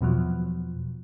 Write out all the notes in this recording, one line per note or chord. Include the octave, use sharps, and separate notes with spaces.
E2 B2 F3 F#3